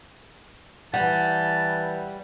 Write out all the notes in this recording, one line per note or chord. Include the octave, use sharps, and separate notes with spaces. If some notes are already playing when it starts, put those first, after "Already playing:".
E3 G3 F#5 A5